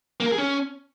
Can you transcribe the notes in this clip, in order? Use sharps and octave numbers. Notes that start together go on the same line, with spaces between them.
A#3
A#4
G#4
C#4